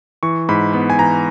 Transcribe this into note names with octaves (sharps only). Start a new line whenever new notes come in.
E3 C#6
G#2 B5
B3 B5
G#5
E3 A#5